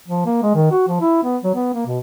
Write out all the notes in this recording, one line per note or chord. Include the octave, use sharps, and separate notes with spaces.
F3
A#3
G#3
D#3
F#4
F3
E4
B3
F#3
B3
A#3
B2